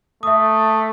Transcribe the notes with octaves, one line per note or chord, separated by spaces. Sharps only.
A3 E5 D#6